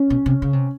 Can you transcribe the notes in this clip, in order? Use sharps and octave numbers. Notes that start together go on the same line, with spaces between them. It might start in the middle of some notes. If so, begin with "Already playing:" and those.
Already playing: C#4
B2
C3
C#3
C3